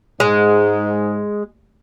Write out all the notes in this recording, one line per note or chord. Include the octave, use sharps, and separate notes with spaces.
G#2 G#3